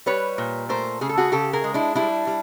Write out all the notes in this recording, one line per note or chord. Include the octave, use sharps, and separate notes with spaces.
G3 B4 C#5
A#2
A3 A#4 C5
C#3 G#4
A4
F#4 G#4
C#3 G4 A4
G#4 A#4
G#3
D4 E4
G3 D4 E4
G3